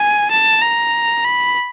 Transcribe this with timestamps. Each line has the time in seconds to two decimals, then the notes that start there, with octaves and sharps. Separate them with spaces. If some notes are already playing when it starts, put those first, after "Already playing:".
Already playing: G#5
0.31 A5
0.62 A#5
1.25 B5